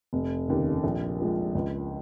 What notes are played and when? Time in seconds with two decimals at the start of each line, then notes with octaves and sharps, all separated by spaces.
0.13 F1
0.48 D#2 C#3
0.84 A#1
1.19 A#2 G#3
1.55 C#2